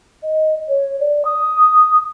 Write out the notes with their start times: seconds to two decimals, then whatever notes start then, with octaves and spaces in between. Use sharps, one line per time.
0.23 D#5
0.68 C#5
1.00 D5
1.25 D#6